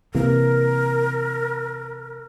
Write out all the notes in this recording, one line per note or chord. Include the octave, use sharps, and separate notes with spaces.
C3 E3 A#3 A#4